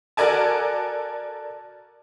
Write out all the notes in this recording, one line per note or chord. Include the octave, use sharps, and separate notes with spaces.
F#4 A4 A#4 D5 G#5 A5